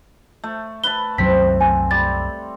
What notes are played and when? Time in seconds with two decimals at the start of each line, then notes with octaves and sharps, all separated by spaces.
0.44 A3
0.84 B4 A5 G7
1.18 C2 F#2 F#3 C4 B6
1.61 G#5
1.91 G3 A6